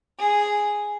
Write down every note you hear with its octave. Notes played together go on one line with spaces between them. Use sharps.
G#4